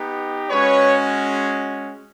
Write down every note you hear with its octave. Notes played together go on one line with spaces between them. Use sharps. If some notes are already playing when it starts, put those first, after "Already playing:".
Already playing: B3 D#4 G4
G#3 C#4 F#4 B4 C#5